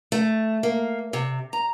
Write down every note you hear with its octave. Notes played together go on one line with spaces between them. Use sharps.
A3
A#3
C3
A#5